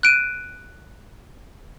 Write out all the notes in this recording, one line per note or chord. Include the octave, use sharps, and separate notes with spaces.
F#6 D7 D#7